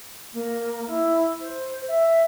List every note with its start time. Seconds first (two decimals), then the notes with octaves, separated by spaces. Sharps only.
0.33 A#3
0.86 E4
1.40 C5
1.87 E5